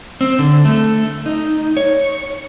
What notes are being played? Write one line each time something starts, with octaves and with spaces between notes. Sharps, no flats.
C4
D3
A3
D#4
C#5